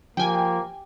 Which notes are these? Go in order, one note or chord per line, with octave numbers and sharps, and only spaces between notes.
F3 A#3 G4 G5 G#5